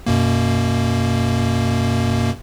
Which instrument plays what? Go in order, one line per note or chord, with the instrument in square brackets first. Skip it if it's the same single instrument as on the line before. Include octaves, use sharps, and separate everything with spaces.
[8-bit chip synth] F#2 B2 A#3